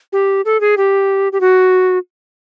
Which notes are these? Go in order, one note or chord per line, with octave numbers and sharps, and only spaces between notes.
G4
A4
G#4
G4
G4
F#4